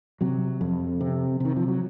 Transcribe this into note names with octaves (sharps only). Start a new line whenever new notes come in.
C3 F#3
F2
C3
C3 D#3
F3
F#3